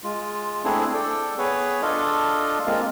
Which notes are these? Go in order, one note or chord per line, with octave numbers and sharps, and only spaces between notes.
G#3 F4
A3 C4 D4 E4 G#4
A4 D5 G5
B3 G#4 B4 C#5
D4 F4 A4 D5 D#5 F5
G#3 A#3 C4 F4